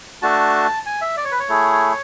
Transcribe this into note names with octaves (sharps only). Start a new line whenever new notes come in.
A3 D4 F#4 A5
G#5
E5
D5
C#5
B4
C#5
A3 E4 G#4